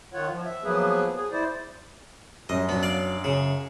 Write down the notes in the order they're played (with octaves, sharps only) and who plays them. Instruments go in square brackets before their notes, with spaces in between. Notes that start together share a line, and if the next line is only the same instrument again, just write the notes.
[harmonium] D#3 F4 C#5 F#5
F3
E5
F3 F#3 A#3 B3 G#4 B4
G#4
E4 C5 D5
[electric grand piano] F#2 [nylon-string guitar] G3 C#4 [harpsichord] D#5
[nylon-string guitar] F#3 D4 [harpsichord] B3
[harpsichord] D5 F5
[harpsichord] C#3 [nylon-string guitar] G#4